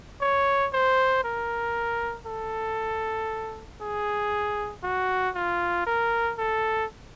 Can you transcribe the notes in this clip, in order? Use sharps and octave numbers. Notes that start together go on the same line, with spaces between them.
C#5
C5
A#4
A4
G#4
F#4
F4
A#4
A4